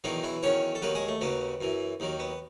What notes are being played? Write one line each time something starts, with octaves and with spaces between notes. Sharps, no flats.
E2 B2 D#3 F#3 D#4
E3 E4
E2 D#3 F#3 C#4 C#5
A4
D#2 D#3 F#3 B3 B4
G#3 G#4
A3
D#2 C#3 F#3 B3
F#2 E3
D#2 D#3 F#3
B3